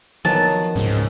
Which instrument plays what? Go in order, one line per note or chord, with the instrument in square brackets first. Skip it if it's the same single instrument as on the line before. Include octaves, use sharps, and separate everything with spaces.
[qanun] D#3 F#3 B3 [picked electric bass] F3 [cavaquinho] A5
[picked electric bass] C#2 C3 C#4 [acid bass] G#2